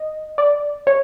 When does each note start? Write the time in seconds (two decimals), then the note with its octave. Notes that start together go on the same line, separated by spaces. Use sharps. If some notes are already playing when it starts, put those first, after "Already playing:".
Already playing: D#5
0.38 D5
0.87 C#5